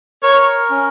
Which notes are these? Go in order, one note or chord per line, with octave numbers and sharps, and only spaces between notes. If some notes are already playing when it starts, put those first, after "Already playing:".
A#4 C#5
C#4